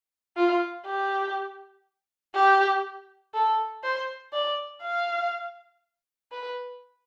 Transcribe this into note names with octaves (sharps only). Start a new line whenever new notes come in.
F4
G4
G4
A4
C5
D5
F5
B4